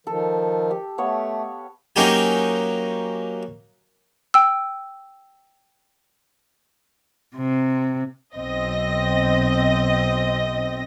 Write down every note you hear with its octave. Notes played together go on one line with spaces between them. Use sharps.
D#3 F3 A4
G4
A3 B3 C#5 F5
F#3 A#3 C#4 D#4 G4 G#5
G5 E6
C3
B1 C4 D#5 A#6